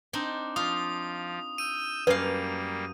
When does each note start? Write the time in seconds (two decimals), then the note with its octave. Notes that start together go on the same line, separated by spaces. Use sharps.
0.13 C4 D4 D#4
0.56 F3 F4 D#6
1.58 E6 G6 D#7
2.07 F#2 G3 A#3 B4 F5